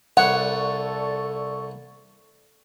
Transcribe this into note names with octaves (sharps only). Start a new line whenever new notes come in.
C2 A4 C#5 D5 F#5 C#6